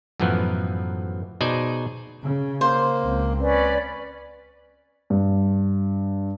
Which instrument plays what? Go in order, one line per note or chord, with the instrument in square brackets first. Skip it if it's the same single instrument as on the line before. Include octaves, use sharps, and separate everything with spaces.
[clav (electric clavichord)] F#2 A2 E3 F3 B3
B2 D#4 G#4 C5 D5 G#5
[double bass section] C#3
[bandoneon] A#3 [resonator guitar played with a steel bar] C5
[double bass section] C#2 C4
[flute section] C#4 B4 D5
[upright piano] G2